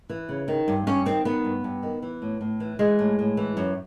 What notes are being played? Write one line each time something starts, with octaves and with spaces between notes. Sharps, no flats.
E3
C#3
D#3
G2
G2 C#4
D#3 C4
D#3 B3
G2
G2
D#3
E3
A2
A2
E3
E3 G#3
A2
A2
E3
F#2